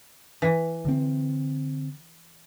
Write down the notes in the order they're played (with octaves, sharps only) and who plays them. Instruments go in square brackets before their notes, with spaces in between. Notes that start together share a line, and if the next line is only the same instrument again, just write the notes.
[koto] E3
[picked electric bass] D3 C4